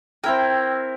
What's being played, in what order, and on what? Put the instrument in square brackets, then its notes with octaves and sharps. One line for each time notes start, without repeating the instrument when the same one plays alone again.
[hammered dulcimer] C4 E4 A#4 [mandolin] G5